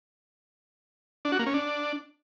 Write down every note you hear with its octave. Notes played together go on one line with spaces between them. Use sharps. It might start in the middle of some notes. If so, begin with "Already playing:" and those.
D4
F#4
A#3
C#4
D4